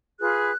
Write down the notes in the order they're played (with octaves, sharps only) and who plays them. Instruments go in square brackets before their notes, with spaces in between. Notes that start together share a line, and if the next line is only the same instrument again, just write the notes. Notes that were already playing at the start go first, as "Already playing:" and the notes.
[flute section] F4 G#4 B4 F#6